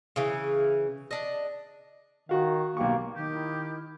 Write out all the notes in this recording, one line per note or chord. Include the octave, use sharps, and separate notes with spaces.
C#3 E3
D4 D#5
D#3 F#4 F5
B1 A#3 G4 C#6
D#3 G4
E4